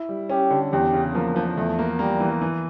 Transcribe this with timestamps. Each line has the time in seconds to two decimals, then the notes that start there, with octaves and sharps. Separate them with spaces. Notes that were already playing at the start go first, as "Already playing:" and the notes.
Already playing: E4
0.09 G3
0.30 C#4 G4
0.51 D3
0.73 E2 G4
0.93 C#3
1.15 F3 A#3
1.36 F3
1.57 E2 A3
1.79 A#3
1.99 G3 A#3
2.20 E3
2.41 E3